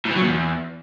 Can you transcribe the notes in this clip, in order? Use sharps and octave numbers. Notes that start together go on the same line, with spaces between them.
A2
E3
F#3
A#2
E2